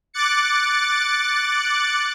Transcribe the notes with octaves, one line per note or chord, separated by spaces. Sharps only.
D6 F#6 A6 C#7